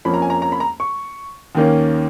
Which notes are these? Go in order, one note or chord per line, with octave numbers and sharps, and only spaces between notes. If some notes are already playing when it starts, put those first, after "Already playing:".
F2 F3 A#3 C#4 B5
A#5
G#5
A#5
A#5
B5
A#5
C#6
D#2 D#3 A#3 C#4